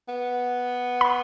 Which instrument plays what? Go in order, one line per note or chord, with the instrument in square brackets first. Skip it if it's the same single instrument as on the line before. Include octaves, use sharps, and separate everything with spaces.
[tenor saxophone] B3
[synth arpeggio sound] B5